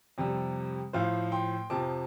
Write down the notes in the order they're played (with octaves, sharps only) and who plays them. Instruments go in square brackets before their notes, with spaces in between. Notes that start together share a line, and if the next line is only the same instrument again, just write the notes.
[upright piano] F2 C3 G3
A2 F3 C5 F5
G5 C6
F2 C3 F3 A5 D6